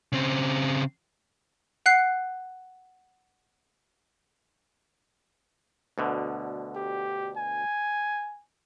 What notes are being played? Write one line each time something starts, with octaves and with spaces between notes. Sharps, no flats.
C#3 C4
F#5 F#6 C7
D2 B2 D3
G4
G#5